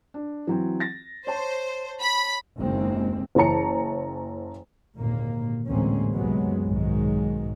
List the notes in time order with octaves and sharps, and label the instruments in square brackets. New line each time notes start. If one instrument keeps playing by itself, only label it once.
[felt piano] D4
E3 F#3 C4
A6 A#6
[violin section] C5 [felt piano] C#5 A5
[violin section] B5
[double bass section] F#1 D#2 C3 G#3 C4
[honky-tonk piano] F#1 E3 C#5 A5 A#5 C#7
[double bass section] G#1 D#2 A#2 D3 A#3
A1 D2 G#3 A#3 C4 C#4
C#2 F#2 C3 F#3 G#3 B3
B1 G#2 D#3 F#3 G#3